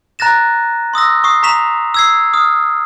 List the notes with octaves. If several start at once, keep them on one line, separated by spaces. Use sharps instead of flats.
A#5 F#6 A6 A#6 E7
C6 D#6 E6 A#6
C#6 D#6 C7
A#5 C#6 B6 E7 F7
E6 G#6 C7
D#6 F6